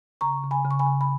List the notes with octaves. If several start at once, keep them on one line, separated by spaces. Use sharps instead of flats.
C#3 A#5 C#6
C#3
G#5 B5
C#3
C#6
G#5 B5
C#3
B5